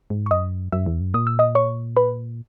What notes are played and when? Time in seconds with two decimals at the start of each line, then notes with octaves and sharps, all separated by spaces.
0.10 G#2
0.26 C#6
0.31 F#2 D#5 D#6
0.72 F#2 E5 E6
0.86 E2
1.01 F#2
1.14 A#2 D#6
1.27 E6
1.39 D#5 D#6
1.55 C#5 C#6
1.96 B4 B5